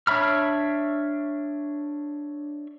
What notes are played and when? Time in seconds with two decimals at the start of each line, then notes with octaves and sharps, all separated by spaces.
0.07 D4 C#5 E5 B5 F6